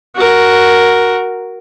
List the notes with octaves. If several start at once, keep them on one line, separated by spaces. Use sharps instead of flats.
F#4 A#4